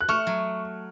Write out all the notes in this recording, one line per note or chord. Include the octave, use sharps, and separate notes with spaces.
F#6
A3 C#6 F6
F#3